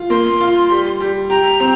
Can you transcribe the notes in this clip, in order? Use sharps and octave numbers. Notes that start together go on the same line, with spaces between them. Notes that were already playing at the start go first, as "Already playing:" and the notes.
Already playing: F4
A#3 C6
F4
G3
G3
G4 A#5
C4